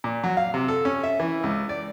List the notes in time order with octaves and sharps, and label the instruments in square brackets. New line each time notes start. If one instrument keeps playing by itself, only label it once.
[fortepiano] A#2
F#3
F5
C3
A4
C#4
E5
E3
C#2
D5